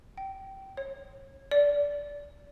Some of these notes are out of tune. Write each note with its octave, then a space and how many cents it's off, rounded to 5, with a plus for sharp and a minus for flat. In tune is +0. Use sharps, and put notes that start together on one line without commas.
G5 -20
C#5 -30
D5 -20